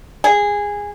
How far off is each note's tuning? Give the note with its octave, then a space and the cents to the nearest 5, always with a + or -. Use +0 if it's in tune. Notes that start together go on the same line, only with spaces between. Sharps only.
G#4 -15